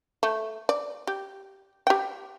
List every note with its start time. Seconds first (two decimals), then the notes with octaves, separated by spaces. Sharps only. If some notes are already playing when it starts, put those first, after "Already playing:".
0.23 A3
0.69 D5
1.07 G4
1.87 G4 G5